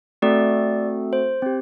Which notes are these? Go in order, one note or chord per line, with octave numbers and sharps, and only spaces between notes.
A3 C4 F#4 A4 D5
C5
C4 G4